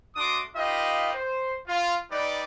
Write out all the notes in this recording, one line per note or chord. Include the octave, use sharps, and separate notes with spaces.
A3 D4 F#4 C6 D6 D#6
D#4 F4 G4 B4 D#5 F5
C5
F4
G3 D#4 B4 D5